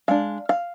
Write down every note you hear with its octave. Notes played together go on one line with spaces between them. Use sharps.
G#3 D4 F5
F5